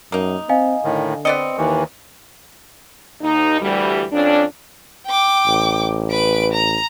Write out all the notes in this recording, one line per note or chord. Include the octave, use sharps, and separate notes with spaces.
F#2 A#3 D#4
C4 D#5 F5 G#5
A2 D3 D#3
B3 C4 D5 D#5 C#7
D#2 D#3 E3
D#2 D#4
D2 E3 G3
F2 C#4 D4
G5 D6
A1
B4 D7
A#5